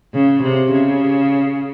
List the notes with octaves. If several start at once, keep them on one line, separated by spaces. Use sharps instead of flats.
C#3
C3
C#3